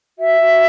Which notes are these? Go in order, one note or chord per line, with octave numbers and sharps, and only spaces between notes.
F#4 E5
F#4